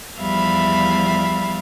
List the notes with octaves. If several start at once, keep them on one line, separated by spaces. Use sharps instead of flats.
E2 F3 G3 E5 F5 B5